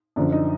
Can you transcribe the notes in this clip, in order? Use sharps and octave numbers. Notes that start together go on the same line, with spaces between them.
F#2 D3 F3 D4
D#4